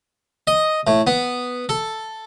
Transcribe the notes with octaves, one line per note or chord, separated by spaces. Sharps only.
D#5
A2
B3
A4